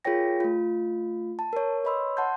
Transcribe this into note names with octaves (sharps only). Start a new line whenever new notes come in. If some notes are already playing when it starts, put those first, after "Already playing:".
F4 G#4 A#4 C#5 G5 A#6
A3 F4
A5
A#4 C#5
B4 C#5 D#5 B5 C6 E6
F#5 A5 C6 G6